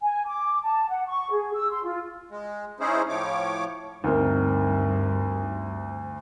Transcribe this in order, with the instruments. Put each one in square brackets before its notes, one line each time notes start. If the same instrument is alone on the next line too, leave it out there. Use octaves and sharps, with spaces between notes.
[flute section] G#5
D6
A5
F#5
C#6
G#4
E6
C6
F4
[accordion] G#3
C#4 D#4 E4 G#4 C5
A2 F3 C#5 D6
[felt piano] D2 C4 [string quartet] G2 [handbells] D#4 A#4